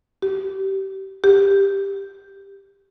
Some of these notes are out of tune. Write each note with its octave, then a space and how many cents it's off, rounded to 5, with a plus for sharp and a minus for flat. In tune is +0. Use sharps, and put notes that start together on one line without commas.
G4 -25
G4 +10